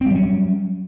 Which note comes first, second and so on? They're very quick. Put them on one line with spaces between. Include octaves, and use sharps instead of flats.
C4 G3 F#3 C#4